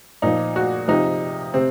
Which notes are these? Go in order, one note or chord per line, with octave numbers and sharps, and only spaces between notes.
A#2 F3 D#4
F#4
C3 F3 D#4
C3 C4